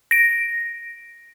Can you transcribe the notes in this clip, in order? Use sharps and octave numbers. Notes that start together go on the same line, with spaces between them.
A#6 D7